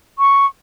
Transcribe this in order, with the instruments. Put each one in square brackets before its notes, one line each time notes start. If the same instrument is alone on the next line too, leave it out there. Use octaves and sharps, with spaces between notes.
[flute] C#6